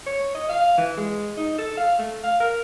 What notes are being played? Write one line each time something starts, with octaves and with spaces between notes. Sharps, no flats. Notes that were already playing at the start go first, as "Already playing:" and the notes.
C#5
D#5
F5
E3
G#3
D#4
A4
F5
A3
F5
A#4